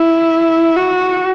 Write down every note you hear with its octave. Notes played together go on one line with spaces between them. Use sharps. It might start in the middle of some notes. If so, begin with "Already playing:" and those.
Already playing: E4
F#4